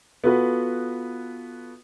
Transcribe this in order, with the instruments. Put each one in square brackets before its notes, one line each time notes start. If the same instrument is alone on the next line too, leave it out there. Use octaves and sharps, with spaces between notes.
[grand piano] B3 F4 F#4 A4 B4